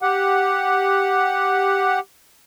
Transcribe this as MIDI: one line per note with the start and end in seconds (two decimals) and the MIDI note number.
0.02 1.99 67
0.02 1.99 78